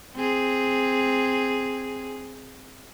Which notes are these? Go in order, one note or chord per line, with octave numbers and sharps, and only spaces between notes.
C4 G#4